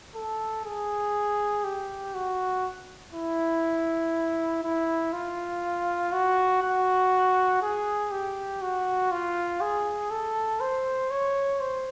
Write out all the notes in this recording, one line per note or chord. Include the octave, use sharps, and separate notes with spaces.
A4
G#4
G4
F#4
E4
E4
F4
F#4
F#4
G#4
G4
F#4
F4
G#4
A4
C5
C#5
C5